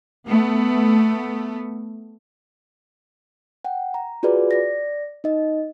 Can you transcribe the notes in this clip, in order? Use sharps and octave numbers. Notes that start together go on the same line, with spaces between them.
A3 B3
F#5 G5
A#5
F4 F#4 G#4 B4 D5
D5 A#6
D#4 D#5